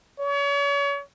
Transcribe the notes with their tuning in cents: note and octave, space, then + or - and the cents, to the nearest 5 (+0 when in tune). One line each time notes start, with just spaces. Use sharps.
C#5 +35